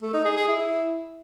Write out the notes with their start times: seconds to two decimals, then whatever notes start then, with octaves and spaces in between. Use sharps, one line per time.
0.02 A3
0.13 D#4
0.25 G#4
0.36 G#4
0.48 E4